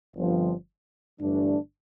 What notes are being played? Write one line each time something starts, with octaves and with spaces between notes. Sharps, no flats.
G1 G2 F3 C4
G1 G2 E3 A3 D4